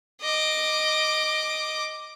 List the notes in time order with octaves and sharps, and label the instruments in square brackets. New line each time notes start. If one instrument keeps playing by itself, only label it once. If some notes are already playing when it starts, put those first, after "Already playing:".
[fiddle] D#5 D6